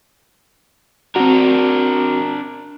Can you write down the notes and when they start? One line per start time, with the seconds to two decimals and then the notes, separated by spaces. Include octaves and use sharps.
1.16 C4 D4 F#4 A#4